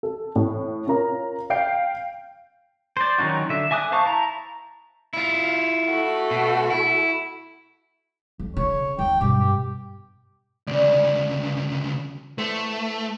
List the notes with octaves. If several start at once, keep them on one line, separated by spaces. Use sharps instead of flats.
A4
A2
C#4 F4 A#4 A#5
F5 G5 G6 C7 D7
C5 D5
D#3 F#3 C#4 D#4 F#4
D3 E5
E5 G#5 D6 D#6 F#6
C5 F5 A5 C#6
E4 A5 A#5
E4 F4
A3 F#4
B2
E4
F2
C#3 C#5
D#2 G5
G2 B2 G4
G4
D2 C#3 D5
A2 A3 B3 C5